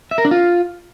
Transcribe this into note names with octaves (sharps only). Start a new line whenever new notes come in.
E5
A#4
D4
F4